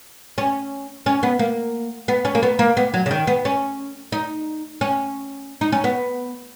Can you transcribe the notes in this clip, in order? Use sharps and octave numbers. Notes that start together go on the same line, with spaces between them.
C#4
C#4
B3
A#3
B3
C#4
A#3
B3
A#3
B3
F#3
C#3
D#3
B3
C#4
D#4
C#4
D#4
C#4
B3